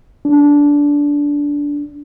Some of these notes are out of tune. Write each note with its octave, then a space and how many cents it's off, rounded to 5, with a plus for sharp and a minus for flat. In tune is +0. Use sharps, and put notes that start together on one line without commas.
D4 -15